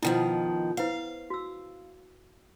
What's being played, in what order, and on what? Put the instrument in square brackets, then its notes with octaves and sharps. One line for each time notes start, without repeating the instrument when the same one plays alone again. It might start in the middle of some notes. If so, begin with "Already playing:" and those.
[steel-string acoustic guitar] B2 D#3 F3 [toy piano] E4
[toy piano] E4 B4 C5 [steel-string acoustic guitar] F5
[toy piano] F#4 E6